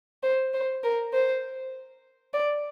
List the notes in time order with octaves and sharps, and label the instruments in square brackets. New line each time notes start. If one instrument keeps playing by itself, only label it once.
[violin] C5
C5
A#4
C5
D5